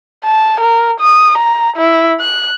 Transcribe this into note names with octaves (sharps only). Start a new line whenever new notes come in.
A5
A#4
D#6
A#5
E4
F#6